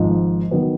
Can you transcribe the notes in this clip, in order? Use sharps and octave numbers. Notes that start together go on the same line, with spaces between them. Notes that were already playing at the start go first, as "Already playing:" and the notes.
Already playing: G#1 G#2 F3
D#3 F#3 B3